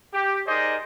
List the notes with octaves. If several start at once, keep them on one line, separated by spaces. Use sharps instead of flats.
G4
D#4 G#4 A#4 C5 D5 D#5